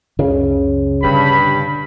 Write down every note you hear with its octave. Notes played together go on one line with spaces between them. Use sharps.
C#2 F#2 C#3
G2 B2 D3 B5